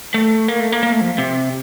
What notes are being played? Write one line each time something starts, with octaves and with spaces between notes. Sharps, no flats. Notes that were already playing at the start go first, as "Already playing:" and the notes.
A3
A#3
A3
A#3
A#3
A3
F3
C3